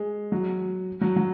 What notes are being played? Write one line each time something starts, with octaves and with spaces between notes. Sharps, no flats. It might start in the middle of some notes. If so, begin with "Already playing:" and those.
Already playing: G#3
F#3
F#3
F#3